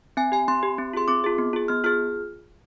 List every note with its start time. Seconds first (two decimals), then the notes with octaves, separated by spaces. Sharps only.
0.17 C4 G#5
0.32 G4 G#5
0.48 C4 C6
0.63 G4
0.78 C4
0.93 F4 G#4 C6
1.08 C4 D6
1.24 F4 G#4
1.38 B3
1.53 F4 G#4
1.68 B3 F6
1.84 F4 G#4 F6